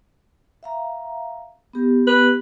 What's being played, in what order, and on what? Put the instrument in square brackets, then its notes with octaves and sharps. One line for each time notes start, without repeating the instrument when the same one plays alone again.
[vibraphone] E5 F5 A#5
B3 G4
[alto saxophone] B4